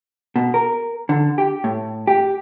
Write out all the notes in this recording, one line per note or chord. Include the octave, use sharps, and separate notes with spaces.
B2
A#4
D3
G4
A2
G4